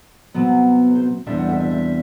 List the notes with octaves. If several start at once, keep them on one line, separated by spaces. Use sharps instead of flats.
C3 F#3 B3
C5
E2 C3 G3 D4 E5
F#5
E5
E5
E5